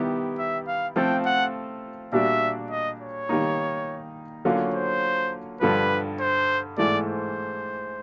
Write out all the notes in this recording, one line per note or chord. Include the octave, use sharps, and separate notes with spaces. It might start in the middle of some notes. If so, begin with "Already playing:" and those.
Already playing: D#3 G3 B3 E4 G4
E5
F5
F3 A3 C4 F4 A4 G5
F#5
A#2 G3 A#3 D4 F#4 E5
D#5
C#5
D#3 G3 A#3 D#4
D3 F#3 A#3 C#4 F4
C5
G2 D3 F3 B4
C5
G#2 E3 A3 D5
C5